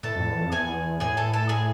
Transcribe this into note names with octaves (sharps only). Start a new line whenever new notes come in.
A2 A4 A5
F2
E2
F2
E2 G#4 G#5
A2 G#4 G#5
A4 A5
A4 A5
G#4 G#5